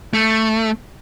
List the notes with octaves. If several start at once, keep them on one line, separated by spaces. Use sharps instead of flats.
A3